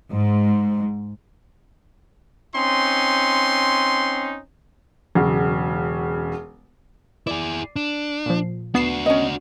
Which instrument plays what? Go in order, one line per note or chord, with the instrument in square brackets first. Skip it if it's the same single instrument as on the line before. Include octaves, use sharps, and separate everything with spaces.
[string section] G#2
[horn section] C4 C#4 D#4 C6
[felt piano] E1 C#3 F#3
[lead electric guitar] E4 G#4 [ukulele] D5
[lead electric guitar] D4
[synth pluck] A#2 F3
[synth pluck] B3 C7 E7 [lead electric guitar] D4 F#4
[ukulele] C#4 D#5